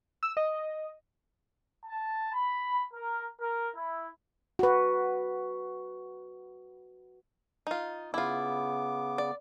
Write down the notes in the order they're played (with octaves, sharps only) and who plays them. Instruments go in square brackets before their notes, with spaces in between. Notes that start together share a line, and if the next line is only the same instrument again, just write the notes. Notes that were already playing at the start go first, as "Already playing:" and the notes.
[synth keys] E6
D#5
[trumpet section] A5
B5
A#4
A#4
E4
[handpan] F#4 B4
[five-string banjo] D#4 F4
[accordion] C#3 B3 D6 [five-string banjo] E4 F4
[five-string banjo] D5